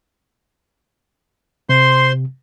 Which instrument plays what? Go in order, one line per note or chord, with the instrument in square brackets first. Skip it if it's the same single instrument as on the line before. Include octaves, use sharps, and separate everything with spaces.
[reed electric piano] C3 [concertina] C5 C6